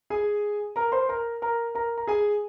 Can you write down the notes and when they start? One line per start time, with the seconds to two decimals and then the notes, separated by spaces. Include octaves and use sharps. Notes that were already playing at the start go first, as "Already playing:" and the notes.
0.10 G#4 G#5
0.76 A#4 A#5
0.92 C5 C6
1.09 A#4 A#5
1.42 A#4 A#5
1.75 A#4 A#5
1.98 A#5
2.07 G#4 G#5